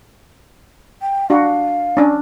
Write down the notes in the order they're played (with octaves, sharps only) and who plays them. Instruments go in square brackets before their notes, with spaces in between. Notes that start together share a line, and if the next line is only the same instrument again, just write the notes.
[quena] G5
[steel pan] D4 F#4 [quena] F5
[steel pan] C#4 D4